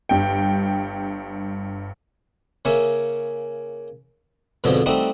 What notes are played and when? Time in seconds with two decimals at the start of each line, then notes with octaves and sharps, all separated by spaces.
0.09 G1 G2 G5
2.65 C#3 A#3 C#4 E5 C#6
4.64 F2 G#2 B2 D3 F3
4.86 G3 A3 C4 D#4 F#4